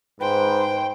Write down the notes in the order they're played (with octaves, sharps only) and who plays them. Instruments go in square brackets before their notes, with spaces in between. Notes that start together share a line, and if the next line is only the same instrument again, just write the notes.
[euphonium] G#2 [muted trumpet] B4 [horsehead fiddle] C5 [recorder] G5